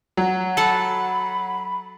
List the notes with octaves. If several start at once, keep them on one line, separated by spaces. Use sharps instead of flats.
F#3
A4 F#5 A5 B5